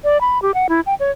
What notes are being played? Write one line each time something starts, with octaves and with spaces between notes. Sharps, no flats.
D5
B5
G4
F#5
E4
G5
C#5